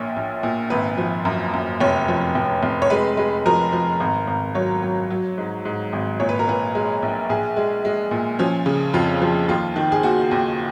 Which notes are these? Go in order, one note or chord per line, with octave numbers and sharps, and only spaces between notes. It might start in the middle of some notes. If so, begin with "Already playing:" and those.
Already playing: A#1 A#2 C#5
A#1
A#2
G#1 B4
F3
F#2
F#2
F1 C#5
F3
F1
F1
C#5
G#3 B4
G#3
F3 A#4
F3
G#1
G#1
F#3 C#5
F#3
F#3
G#2
G#2
G#1
A#2 C#5
B4
A#4
A#2 B4
G#3
A#1
A#1 G#4
G#3
G#3
A#2
F3 C#4
C#3
F2 F4
F3
D#2 F4
D#3
G#4
D#2 F#4
D#2